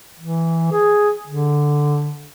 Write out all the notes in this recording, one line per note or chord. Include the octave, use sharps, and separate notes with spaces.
E3
G#4
D3